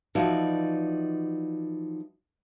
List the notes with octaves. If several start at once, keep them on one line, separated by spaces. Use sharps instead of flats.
E3 F3 D#4 F#4 D5